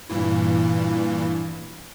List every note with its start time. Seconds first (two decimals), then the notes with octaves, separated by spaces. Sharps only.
0.09 G2 A#2 E3